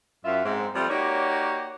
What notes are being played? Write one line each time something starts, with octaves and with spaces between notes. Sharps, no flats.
F#2 F4 E5
G#2 C4
F3 G3 A3 C4
A#3 D#4 F#4 G4 C#5 D5